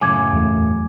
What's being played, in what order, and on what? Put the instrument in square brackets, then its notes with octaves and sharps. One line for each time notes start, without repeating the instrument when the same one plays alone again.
[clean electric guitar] F#2 A2 C#3 [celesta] G#5 D6 G#6
[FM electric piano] E2 A3